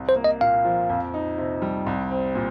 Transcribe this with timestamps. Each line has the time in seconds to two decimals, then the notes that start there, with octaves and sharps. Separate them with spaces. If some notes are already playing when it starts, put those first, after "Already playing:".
Already playing: C2
0.09 C5
0.16 A#3
0.24 D#5
0.41 A#2 F5
0.65 F3
0.89 F2
1.14 D#4
1.38 C3
1.62 G3
1.86 C2
2.11 C4
2.35 A#2